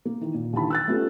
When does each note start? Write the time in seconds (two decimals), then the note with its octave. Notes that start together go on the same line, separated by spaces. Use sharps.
0.05 A#3
0.21 D#3 E3
0.34 A#2
0.53 D#2 D3 E3 A5 B5
0.70 E6 F#6 A6
0.88 A3 B3 C#4 F4 G4 A4